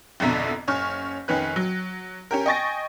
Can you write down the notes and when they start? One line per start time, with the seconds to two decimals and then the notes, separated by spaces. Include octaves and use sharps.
0.20 G#1 F2 B2 D3 E5 A#5
0.67 F#1 C#4 C#6 F6
1.28 F1 D#3 C#4 B4 F#6
1.56 F#3
2.31 C#4 G4 A#4
2.46 D#5 G5 G#5 C#6 A6 A#6